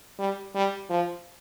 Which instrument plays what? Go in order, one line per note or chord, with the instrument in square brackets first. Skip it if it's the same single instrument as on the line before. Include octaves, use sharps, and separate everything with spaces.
[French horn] G3
G3
F3